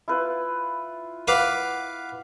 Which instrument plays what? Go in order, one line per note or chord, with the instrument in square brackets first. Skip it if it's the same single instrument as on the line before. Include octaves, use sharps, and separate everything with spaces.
[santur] E4 F4 B4
[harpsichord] B4 F5 D6 [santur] F#5